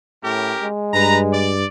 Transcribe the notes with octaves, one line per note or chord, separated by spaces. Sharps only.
A2 C#4 G4 A#4
G#3
G2 B4 A#5
D5